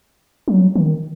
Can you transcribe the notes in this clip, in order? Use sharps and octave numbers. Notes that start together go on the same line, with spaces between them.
F#3
D#3